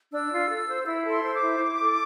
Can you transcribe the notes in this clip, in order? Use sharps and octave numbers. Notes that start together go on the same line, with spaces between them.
D4 E6
F4
A4
C5
E4 E6
A4
C6
C5 E6
D6
E4
E4
A4